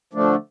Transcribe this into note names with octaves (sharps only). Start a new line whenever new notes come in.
D3 F3 A3 D4